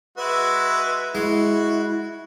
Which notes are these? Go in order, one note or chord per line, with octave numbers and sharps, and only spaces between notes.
G#3 F#4 B4 E5
G#3 E4 F#4 C#6